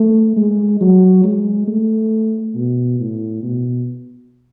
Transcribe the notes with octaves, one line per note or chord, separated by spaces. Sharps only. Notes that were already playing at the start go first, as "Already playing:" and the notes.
Already playing: A3
G#3
F#3
G#3
A3
B2
A2
B2